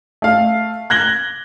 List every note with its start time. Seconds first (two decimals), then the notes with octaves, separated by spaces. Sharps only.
0.22 A3 F5
0.90 F#6 G#6 A#6 F#7 G7